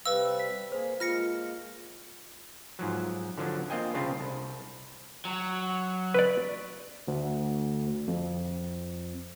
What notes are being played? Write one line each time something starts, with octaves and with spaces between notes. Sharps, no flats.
C3 G3 B4 F5 E6
B6
A#3 G#4 C5
G#3 A#3 F4 F6 A#6 C#7
G#2 F3 F#3
D3 F3 F#3 D4
A#3 C4 F4 D#5 G5 G#5
C2 C#3 C4 D4 F4
C2
F#3
B4 D5
D2
F2